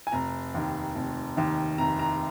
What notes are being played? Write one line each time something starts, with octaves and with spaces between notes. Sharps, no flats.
G#5
F1 A#5
D#2 D#3
F1
D#2 D#3
F1 A#5
A#5